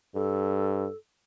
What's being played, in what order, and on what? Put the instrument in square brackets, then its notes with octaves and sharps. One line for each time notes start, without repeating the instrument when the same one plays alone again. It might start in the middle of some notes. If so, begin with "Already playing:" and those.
[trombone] G2 [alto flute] A4